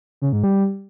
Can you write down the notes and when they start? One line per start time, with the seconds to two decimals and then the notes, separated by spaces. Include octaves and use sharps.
0.22 C#3
0.33 G#2
0.44 G3